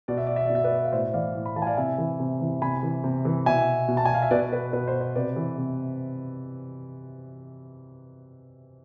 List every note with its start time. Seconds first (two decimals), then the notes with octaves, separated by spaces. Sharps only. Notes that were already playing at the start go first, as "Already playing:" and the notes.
0.08 B2 D5
0.18 E5
0.27 D5
0.36 E5
0.46 B2 D5
0.55 E5
0.64 B4 D5
0.85 F5
0.92 A2 C5 E5
1.14 E3 D5 F5
1.35 A2
1.46 B5
1.56 E3 F5 A5
1.62 G#5
1.67 D5 F5
1.77 C3 E5 G#5
1.98 E3
2.20 C3
2.41 E3
2.62 C3 G#5 B5
2.83 E3
3.04 C3
3.25 E3
3.46 B2 E5 G#5
3.88 B2
3.97 A5
4.05 G#5
4.14 F5
4.22 E5
4.31 B2 B4 D5
4.53 B4
4.73 B2 B4
4.88 C5
5.01 C5
5.16 C3 B4 D5
5.36 E3
5.58 C3